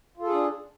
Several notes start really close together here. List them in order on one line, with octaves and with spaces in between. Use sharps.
F4 A4 G#4 D4